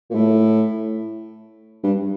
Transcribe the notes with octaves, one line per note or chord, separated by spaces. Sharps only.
A#2
A2
G2